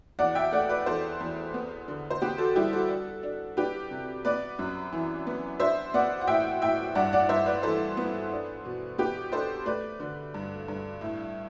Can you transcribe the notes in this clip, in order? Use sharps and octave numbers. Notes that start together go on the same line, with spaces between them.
E2 D5 F#5
E5 G5
A3 D5 F#5
B4 D5
E2 A4 C5
E2
B3
D3
C5
B3 G4 B4
F#4 A4
G3 E4 G4
F#4 A4
D4
D4
D4 G4 B4
C3
B3 B4 D5
F#2
E3
B3
D4 C5 E5
B3 D5 F#5
F#5
A2 E5 G5
A2 E5 G5
G2 D5 F#5
D5 F#5
G2 C5 E5
B4 D5
E3 A4 C5
B3
D4
B2
B3 G4 B4
D4 A4 C5
A3 B4 D5
D3
G2
G2
A2